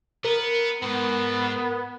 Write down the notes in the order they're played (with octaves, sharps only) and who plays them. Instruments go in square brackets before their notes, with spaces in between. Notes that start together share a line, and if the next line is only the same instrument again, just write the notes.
[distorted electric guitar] B3 [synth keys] A#4
[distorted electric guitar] G#2 [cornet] B3